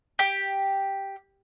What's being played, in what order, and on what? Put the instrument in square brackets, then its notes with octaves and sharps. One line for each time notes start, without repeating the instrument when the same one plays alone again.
[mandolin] G4